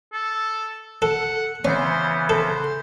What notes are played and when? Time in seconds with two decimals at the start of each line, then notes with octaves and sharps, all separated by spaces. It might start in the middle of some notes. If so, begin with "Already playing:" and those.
0.13 A4
1.02 A4 F#5
1.65 C#3 E3 B3 C#4 C5
2.29 A4 C5